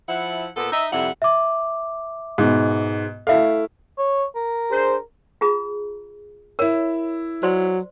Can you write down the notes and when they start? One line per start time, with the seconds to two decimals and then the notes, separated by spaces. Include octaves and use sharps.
0.09 F3 E4 F#5
0.57 A#2 A#3 B3 A4
0.71 D#4 E5
0.92 F2 C3 G3 E4 E5 F#5
1.22 E5 D6
2.38 G#2 B2
3.27 A3 E4 A4 E5 F5
3.98 C#5
4.36 A#4
4.71 D4 G#4 C5
5.41 F4 G#4 A#5
6.59 E4 A#4 C#5 E6
7.43 F#3 C5 D5 C6